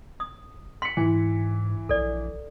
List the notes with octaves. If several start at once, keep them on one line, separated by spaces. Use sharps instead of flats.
D#6
C6 B6 C#7
G#2 E3 G#5
A#1 A4 D5